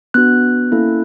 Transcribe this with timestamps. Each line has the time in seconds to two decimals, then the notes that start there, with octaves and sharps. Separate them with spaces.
0.14 B3 D4 F#4 F#6
0.72 A#3 C#4 E4 A4